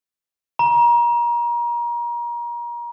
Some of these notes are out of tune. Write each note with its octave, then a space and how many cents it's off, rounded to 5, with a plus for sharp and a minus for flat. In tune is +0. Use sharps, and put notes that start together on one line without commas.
A#5 +30